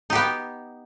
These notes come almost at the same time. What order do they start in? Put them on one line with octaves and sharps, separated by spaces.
D#4 G4 B3